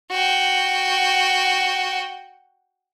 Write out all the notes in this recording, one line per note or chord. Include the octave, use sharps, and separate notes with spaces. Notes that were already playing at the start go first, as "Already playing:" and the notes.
F#4 G5